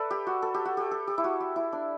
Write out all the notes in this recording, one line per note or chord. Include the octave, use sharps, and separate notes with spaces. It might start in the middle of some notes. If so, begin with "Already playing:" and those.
Already playing: A4 B4 D5 E5
G4
F#4
A4
G4
F#4
G4
A4
G4
E4
F#4
G4
E4
D4